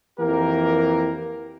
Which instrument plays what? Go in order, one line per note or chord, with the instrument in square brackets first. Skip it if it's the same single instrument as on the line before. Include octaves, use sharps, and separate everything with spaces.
[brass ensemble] F2 E3 A#3 G4 A#4